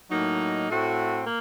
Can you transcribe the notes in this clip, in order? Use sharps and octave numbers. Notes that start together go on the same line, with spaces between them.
A2 F#3 A#3 D#4
A2 A3 C4 F#4
A#3